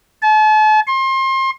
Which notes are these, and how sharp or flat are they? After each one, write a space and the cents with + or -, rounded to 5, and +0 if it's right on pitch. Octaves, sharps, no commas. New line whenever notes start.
A5 -40
C6 +30